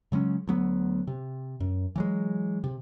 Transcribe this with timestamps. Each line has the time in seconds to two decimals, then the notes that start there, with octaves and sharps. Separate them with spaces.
0.12 C#3 F#3 G#3 C#4
0.48 D2 F#3 B3
1.07 C3
1.60 F#2
1.96 E3 F#3 G#3
2.64 C3